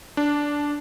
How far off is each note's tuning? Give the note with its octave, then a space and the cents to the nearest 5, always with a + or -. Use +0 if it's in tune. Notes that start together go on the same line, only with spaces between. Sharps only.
D4 -10